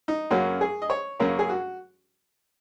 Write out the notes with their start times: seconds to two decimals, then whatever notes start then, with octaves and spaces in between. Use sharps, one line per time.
0.08 D#4
0.31 F#2 C#3 A#3 C#4 F#4
0.61 G#4
0.82 D#5
0.90 C#5
1.20 F#2 C#3 A#3 C#4 A#4
1.39 G#4
1.49 F#4